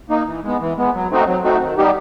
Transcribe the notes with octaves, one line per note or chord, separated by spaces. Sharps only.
A#3 D#4
E3
G#3 B3
E3
G#3 B3
F#3
A3 C4 D#4 F#4
F#3
A3 C4 D#4 F#4
D#3
G3 B3 D#4 G4